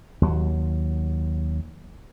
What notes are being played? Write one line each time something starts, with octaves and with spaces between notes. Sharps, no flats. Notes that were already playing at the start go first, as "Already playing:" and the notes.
D#2 F#3